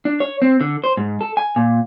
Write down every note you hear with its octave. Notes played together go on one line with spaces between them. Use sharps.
D4
C#5
C4
D3
C5
G#2
A4
G#5
A#2